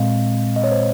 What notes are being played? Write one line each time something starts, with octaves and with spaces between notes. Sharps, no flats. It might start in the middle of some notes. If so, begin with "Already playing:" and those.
Already playing: A#2 G#3 C4 D#5 F5
D#5
C#5
C5